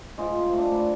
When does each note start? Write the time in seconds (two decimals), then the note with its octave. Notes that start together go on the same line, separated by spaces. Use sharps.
0.18 G#2 G#3 F4 C5
0.41 C4 F5
0.54 A3 D4
0.73 A#4 B4 D5